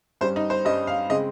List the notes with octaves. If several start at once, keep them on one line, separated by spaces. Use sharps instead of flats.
G2 G3 C#4 C5
D#4
C5
G2 G3 C#4 D#5
F5
C#3 G#3 C4 D#5